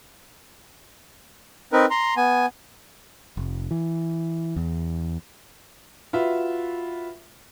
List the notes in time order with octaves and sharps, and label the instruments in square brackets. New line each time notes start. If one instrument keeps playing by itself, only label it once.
[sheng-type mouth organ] C4 D#4 A#4 B4
A#5 C6
B3 G#5
[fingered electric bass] F1
E3
E2
[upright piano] F4 F#4 B4 E5